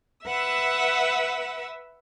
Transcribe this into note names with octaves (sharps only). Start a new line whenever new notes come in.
B4 E5 F#5 E6